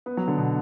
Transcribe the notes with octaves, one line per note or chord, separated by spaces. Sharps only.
B3
F#3
D3
B2